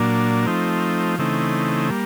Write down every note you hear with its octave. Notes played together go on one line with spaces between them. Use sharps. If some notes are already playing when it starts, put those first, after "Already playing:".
Already playing: A#2 F#3 A#3 D4
F3 A3 C4 D#4
C#3 E3 A3 C4 D#4
G3 A#3